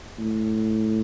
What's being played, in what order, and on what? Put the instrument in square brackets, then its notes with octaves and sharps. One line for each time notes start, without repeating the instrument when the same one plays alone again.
[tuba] A2